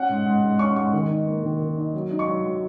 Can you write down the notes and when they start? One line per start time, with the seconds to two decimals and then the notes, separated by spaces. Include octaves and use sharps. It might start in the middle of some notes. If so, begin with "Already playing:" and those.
Already playing: C#4 F#5
0.09 G#2
0.26 G#2
0.43 G#2
0.59 C#4 C#6
0.76 G#2 C#6
0.93 D#3
1.10 D#4
1.27 A#3
1.44 D#3
1.60 D#3
1.77 D#4
1.94 F#3
2.11 D#4
2.19 C#6
2.28 F#3
2.44 F#3